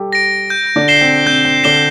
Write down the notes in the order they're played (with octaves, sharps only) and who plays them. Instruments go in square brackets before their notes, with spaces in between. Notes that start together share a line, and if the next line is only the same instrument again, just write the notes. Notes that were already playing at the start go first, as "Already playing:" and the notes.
Already playing: [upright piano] G3 G4 A4
[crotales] A#6 D7
G6
[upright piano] D3 D4
[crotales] C7 E7 G7
[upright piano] C4
[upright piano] C4 [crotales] G6
[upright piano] C4
[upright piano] D3 D4 [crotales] C7 E7 G7